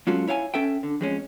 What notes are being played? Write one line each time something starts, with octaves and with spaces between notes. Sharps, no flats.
F#3 G#3 C#4 F4 F#4 A4
E4 C#5 F5 F#5 G#5
C#4 A4 E5 G5
D3
F2 G#3 C#4